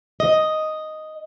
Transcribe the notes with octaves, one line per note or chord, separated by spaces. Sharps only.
D#5